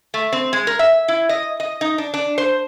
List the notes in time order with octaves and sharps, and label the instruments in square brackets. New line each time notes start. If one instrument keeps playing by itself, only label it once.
[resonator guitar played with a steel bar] A3
C4
G#3
A#4
E5
E4
D#5
D#5
D#4
D4
D4
C5